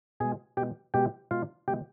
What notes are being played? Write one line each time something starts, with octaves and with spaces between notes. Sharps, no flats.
B2 G#3 G#4 G#5
B2 G#3 G4 G5
B2 G#3 G4 G5
B2 G#3 F4 F5
B2 G#3 G4 G5